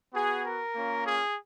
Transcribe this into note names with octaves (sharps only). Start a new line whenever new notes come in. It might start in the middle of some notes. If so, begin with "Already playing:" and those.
B3 F#4 G#4
A#4
A#3 C#4 F4
G#4